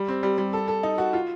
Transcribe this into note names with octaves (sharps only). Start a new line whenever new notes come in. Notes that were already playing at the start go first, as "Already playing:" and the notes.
Already playing: G3
C4
G3
G3
A4
A4
D#4
F#4
F4